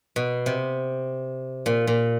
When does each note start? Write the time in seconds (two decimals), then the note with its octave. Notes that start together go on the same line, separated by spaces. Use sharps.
0.16 B2
0.46 C3
1.66 A#2
1.87 A#2